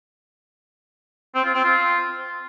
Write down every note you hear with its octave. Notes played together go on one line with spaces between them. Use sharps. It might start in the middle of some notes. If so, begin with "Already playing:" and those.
C4
F4
C4
F4